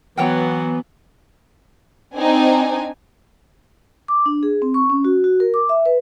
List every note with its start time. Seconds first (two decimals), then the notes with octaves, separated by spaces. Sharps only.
0.17 E3 F#3 B3 C#5 F#5 G5
2.16 C4 D4 D#4 G#5
4.08 D6
4.26 D4
4.43 G#4
4.62 C4
4.74 C#6
4.90 C#4
5.05 F#4
5.24 F#4
5.40 A#4
5.54 D6
5.69 E5
5.86 B4